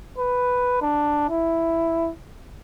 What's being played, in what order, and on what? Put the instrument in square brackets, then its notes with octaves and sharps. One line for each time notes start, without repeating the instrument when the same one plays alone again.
[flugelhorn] B4
D4
E4